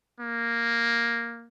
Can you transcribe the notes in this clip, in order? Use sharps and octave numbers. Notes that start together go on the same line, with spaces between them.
A#3